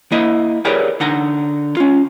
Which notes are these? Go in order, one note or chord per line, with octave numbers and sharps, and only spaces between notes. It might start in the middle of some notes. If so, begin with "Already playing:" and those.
A#3 E4 D#5 E5
G4 G#4 A#4 B4 C#5 D5
D3 D#4 F#5 A#5
C#4 F4